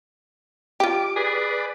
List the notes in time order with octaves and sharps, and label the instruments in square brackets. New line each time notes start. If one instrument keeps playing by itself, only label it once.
[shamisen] F4 G4 [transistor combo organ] D6
[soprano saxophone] G#4 [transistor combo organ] B4 D5